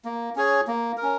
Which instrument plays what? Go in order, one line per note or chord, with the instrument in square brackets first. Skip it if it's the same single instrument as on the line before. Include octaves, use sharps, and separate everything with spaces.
[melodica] A#3
C#4 G#4 C#5
A#3
A#4
C#4